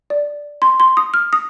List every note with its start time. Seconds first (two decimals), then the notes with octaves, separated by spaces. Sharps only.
0.10 D5
0.62 C6
0.80 C6
0.97 D#6
1.14 F6
1.33 D#6